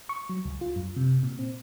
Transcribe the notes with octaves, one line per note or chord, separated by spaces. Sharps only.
C#6
F#3
C#2
F4
F#2
C3
A#2
C4